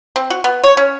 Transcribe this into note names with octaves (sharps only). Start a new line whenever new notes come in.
C4
F#4
B3
C#5
C#4